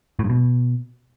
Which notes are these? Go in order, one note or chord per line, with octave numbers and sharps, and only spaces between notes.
A2
G2
B2